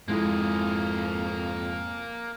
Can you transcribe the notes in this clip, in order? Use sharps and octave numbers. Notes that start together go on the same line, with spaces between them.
F2 G#2 G#3 A#3 E4 G#4